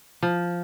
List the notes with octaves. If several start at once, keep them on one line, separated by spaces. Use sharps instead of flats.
F3